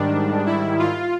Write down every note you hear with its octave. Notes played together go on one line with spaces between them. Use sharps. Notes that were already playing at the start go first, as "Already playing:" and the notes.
Already playing: G#2 D#3 G3 D4
E4
F4